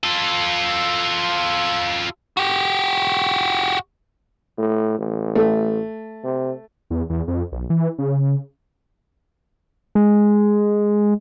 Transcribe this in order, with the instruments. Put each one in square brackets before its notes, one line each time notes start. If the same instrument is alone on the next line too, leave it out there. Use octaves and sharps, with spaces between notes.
[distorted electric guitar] F4 A4
[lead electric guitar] F#4 G4
[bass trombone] A2
A1
[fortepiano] A3
[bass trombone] C3
[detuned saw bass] E2
E2
F2
B1
E3
C#3
[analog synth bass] G#3